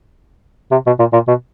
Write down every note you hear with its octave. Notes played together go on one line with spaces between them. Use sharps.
C3
B2
A#2
A#2
B2